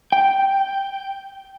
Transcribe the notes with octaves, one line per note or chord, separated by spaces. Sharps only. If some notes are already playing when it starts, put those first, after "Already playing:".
G5